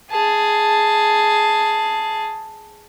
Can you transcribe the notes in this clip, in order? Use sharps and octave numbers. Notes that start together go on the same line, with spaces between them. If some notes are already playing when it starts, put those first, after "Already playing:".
G#4 A5